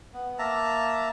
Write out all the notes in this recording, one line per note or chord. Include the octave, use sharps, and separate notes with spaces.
B3
A#3 E5 A5 A#5